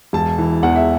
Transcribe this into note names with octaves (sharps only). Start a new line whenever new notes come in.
E1 A5
E3
E2 F#5
E5